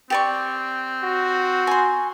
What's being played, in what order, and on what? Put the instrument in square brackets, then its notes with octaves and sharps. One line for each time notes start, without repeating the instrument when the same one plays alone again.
[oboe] C4 [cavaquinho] G4 D5 C#6
[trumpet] F#4
[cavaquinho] G#5 C6